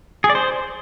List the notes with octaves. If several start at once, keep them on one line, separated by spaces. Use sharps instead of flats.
G#4
D5
C5